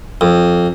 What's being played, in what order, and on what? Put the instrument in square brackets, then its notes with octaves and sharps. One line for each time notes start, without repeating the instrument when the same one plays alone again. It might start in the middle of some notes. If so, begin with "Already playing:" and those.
[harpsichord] F2